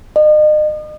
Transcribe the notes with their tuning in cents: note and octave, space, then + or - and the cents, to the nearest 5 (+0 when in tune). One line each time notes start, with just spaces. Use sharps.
D#5 -40